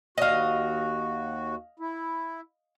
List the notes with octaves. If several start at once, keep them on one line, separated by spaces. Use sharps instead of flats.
D#2 F#4 D#5 F5
E4